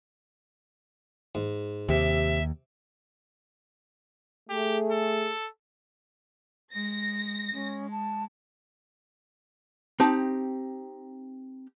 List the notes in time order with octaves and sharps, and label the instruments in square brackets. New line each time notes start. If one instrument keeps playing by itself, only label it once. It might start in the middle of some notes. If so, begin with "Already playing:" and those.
[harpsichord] G#2
[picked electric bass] D#2 [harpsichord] C3 [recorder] E5
[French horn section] A3 G#4 [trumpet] G4
[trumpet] A4
[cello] G#3 [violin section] A#6
[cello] G#3 [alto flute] C#4
[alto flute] A5
[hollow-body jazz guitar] C4 D#4 G4 A5